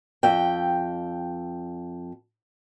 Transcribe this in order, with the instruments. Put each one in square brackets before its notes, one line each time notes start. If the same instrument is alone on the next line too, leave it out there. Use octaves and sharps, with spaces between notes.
[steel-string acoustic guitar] F2 G5